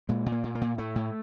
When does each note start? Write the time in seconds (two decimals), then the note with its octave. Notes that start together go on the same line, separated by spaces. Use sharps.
0.09 A#2 G#3
0.26 A#2
0.32 A#3
0.44 A#2
0.55 A#3
0.61 A#2
0.78 A2 A3
0.96 A2